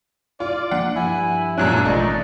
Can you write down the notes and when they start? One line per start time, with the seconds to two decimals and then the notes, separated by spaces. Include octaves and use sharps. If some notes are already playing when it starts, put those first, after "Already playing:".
0.40 F4 D5
0.71 F3 A#3 D4 F#5
0.96 G2 F3 E4 G#5
1.58 F#2 A#2 C#4 D4 F#6
1.85 A1 B2 F3 A3 D#4 D5